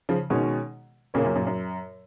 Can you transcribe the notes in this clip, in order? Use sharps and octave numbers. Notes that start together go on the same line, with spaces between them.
C#3 F3
B2 D#3 G#3 C#4 G#4 C#5
A#2 C#3 A#3 C#4 G#4 C#5
F#2 A#2
F#2 A#2
F#2